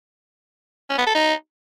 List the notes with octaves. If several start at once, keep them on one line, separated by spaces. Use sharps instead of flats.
C#4
B3
A4
D#4